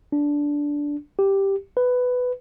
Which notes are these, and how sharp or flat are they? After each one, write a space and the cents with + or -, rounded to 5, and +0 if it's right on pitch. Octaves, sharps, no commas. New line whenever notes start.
D4 -10
G4 +0
B4 +10